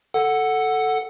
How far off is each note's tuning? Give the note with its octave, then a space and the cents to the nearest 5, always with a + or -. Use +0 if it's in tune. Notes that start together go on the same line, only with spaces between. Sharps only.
A4 +0 F#5 +0